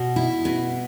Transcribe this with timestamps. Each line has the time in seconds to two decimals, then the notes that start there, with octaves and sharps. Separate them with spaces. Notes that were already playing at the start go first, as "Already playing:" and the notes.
Already playing: B2
0.16 E4
0.45 B2